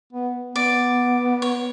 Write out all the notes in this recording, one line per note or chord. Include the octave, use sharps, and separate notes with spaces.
B3
B3 D5
C#5